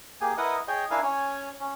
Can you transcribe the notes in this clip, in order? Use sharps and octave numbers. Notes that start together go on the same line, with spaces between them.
A#3 G4 G#4 G#5
E4 A#4 B4 D#5 F#5 D#6
G#4 C#5 D#5 G5
D4 E4 A#4 F5 G#5
C#4 C#5 G#5
C#4